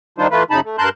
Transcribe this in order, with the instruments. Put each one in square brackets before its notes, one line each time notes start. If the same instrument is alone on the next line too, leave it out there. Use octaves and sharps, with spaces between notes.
[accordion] D#3 G3 D4 D#4 F4 C5
E3 A3 F4 B4
F#2 C#3 D#4 A5 B5
A3
G2 A#4 A5 C6 F#6 G6